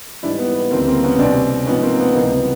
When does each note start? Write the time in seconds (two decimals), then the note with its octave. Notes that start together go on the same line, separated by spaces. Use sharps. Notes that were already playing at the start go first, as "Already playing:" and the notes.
0.23 G#2 E3 G3 D4 E4
0.39 B3
0.54 B3
0.70 D2 C#3 E3 G3 A#3 C4
0.87 A#3 C4
1.03 B3 C#4
1.19 C2 B2 G3 C4 D4
1.67 G#2 F3 B3 C#4
1.83 A#3 C4
2.00 B3
2.15 C#2 C3 E3 G3 A#3
2.31 B3